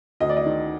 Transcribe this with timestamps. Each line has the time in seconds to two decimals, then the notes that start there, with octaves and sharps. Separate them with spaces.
0.20 D2 D#5
0.29 D5
0.37 D#5
0.45 D#3